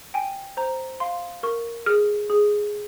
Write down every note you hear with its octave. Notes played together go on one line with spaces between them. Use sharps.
G5 G#5
C5 A#5
F5 C6
A#4 C#6
G#4 F6
G#4